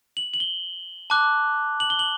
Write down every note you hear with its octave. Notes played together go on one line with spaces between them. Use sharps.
F#7
F#7
G7
A5 D6 F#6
F#7
G7
F#7